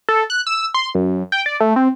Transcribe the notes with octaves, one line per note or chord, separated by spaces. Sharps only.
A4
F#6
E6
C6
F#2
G5
D5
A3
C4